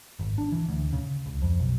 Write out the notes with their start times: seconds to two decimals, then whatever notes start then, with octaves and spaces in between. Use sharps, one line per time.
0.19 G#1
0.38 D4
0.52 E3
0.69 D2
0.93 C#3
1.26 C#2
1.42 F2
1.60 B1